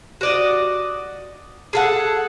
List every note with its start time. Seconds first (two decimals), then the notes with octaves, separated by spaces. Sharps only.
0.21 F#4 D5 D#5
1.73 G#4 A4 F#5